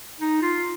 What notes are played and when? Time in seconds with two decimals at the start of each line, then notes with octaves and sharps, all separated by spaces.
0.20 D#4
0.42 F4